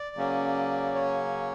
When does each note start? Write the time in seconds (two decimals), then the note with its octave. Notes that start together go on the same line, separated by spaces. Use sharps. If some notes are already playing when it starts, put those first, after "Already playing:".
Already playing: D5
0.15 C#3 F#3 A#3 C#4
0.95 C#5